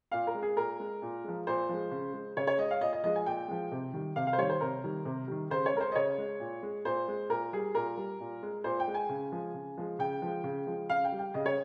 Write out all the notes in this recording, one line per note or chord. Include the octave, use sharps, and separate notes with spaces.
A#2 F5
A#4
G#3
G#4
A#2 A#4
G#3
A#2
F3 G#3
A#2 C5
F3 G#3
C#3
G#3
C#3 C#5
C#5
G#3 D#5
F5
A#2 D#5
D#5
F3 G#3 D#5
G#5
A#2 G5
F3 G#3
C3
D#3 G3
C3 F5
F5
C5
D#3 G3 C#5
C5
C3 A#4
D#3 G3
C3
D#3 G3
C#3 C5
C#5
G#3 A#4
C5
D#5
C#3 C#5
G#3
A#2
G#3
A#2 C5
G#3
A#2 A#4
G3 G#4
A#2 A#4
G3
A#2
G#3
A#2 C5
G5
G#3
G#5
C#3
F3 G#3
C#3
F3 G#3
C#3 G5
F3 G#3
C#3
F3 G#3
C#3 F5
G5
G3
G5
C#3 D#5
C#5